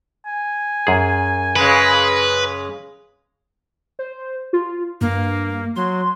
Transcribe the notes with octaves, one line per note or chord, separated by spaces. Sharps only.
G#5
F#2 G#4
C#3 G#3 B4
C5
F4
G2 A#3
F#3 C6